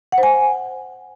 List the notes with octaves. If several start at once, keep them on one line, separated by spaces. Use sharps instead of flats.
F#5
C5
G#5